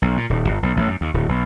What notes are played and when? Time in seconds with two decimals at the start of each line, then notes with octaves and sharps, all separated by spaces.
0.02 B1
0.17 A#2
0.30 D#1
0.49 G1
0.63 B1
0.77 A1
0.88 F#2
1.01 D#2
1.14 D1
1.29 B1